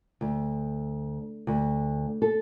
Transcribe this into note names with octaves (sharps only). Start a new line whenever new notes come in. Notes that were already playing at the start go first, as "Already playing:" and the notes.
D2
D2
A4